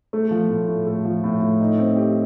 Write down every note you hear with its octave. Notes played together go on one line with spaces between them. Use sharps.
A3
F3
A2
A2
A3
F3
A2
A2
D#4
C4
G4